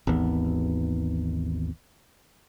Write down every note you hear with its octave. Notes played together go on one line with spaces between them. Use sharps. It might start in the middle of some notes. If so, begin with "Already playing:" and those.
G#1 D#2 E3 B3